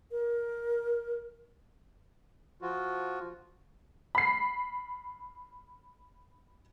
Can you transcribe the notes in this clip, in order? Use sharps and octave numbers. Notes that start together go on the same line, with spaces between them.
A#4
F3 F4 F#4
B5 C7